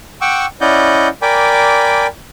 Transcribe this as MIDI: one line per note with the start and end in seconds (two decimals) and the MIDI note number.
0.21 0.46 78
0.21 0.46 79
0.21 0.46 85
0.21 0.46 86
0.21 0.46 88
0.61 1.08 61
0.61 1.08 64
0.61 1.08 74
0.61 1.08 75
0.61 1.08 78
0.61 1.08 91
1.22 2.07 70
1.22 2.07 74
1.22 2.07 79
1.22 2.07 80
1.22 2.07 83
1.22 2.07 86